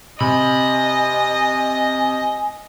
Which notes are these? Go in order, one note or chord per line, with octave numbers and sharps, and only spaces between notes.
C3 D#5 G#5 B5